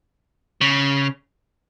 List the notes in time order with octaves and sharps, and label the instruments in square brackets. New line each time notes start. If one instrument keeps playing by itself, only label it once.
[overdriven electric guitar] C#3